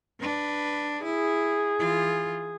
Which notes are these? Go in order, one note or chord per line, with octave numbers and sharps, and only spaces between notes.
D4 B4
E4 G#4
E3 F4